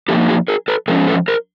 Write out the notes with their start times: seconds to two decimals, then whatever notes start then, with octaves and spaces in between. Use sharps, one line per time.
0.08 F3 A#3 D#4 G4 A4
0.28 F#4 G#4
0.48 G#4 A#4
0.68 A4 B4
0.88 A2 F3 G#3 C#4 G#4 A#4
1.08 A4 B4
1.28 A#4 C5